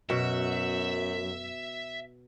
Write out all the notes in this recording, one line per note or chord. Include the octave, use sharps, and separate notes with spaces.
F#2 B2 F#4 E5